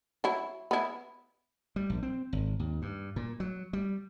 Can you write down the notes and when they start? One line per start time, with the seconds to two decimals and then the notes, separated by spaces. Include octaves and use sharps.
0.24 F#3 E4
0.71 B3 E4
1.76 G3
1.90 A#1
2.03 C4
2.33 G#1
2.60 D#2
2.82 G2
3.16 A#2
3.40 F#3
3.73 G3